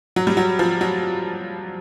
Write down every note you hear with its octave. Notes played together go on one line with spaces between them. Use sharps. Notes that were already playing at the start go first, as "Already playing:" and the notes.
F#3
G3
F#3
F3
F#3